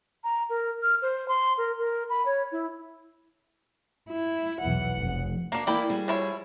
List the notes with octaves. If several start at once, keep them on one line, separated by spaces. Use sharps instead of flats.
A#5
A#4
F6
C5
C6
A#4
A#4
B5
C#5
E4
E4
B1 E2 E3 F#5
F1
A#3 D4 F#4
E3 A#3 E4 D5 G5 B5
G3 F#4 G#4
F3 E4 C#5